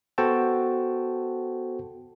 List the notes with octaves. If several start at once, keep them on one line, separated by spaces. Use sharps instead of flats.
B3 F#4 A4 C5 G5 A5